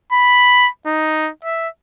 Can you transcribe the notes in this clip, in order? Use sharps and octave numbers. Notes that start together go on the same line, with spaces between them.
B5
D#4
E5